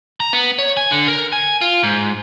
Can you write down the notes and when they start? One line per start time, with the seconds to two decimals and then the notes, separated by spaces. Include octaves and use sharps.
0.20 A#5
0.33 B3
0.59 C#5
0.77 G#5
0.91 D3
1.08 A#4
1.33 G#5
1.61 F4
1.83 G#2